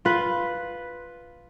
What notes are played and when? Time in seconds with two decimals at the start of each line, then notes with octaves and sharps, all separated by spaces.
0.05 F4 B4